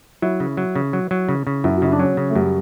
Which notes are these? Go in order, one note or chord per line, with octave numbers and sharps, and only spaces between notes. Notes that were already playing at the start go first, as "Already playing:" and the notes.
F#3 E4
C#3
F#3
C#3
F#3
F#3
C#3
C#3
F#2 E4
F#4
C#3 E4
D4
F#3 C#4
C#3
A3
F#2 G3